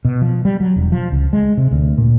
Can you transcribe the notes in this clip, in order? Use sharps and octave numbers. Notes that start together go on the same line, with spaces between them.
B2
F3
G3
F#3
E1
F3
C#2
G#3
C3
D2
A#2